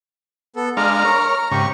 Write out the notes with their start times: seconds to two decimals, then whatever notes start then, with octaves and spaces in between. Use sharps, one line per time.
0.56 B3 A4
0.77 G#3 D4 F5 A#5 F6
1.05 A#4 C#5
1.52 G#2 C#3 G4 C#6